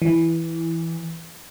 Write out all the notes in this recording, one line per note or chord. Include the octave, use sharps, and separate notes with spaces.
E3